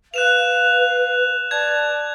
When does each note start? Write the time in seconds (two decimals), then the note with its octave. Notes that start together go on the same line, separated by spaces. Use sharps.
0.14 B4 F5 F#6 E7 F7
1.51 D5 A5 G#6